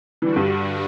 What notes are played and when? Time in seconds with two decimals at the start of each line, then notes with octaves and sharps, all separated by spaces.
0.22 D3 E3 G3 D4 F#4
0.36 G2